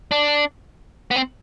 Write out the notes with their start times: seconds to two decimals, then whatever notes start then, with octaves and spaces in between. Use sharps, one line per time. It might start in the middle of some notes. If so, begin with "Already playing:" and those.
0.11 D4
1.11 B3
1.16 C4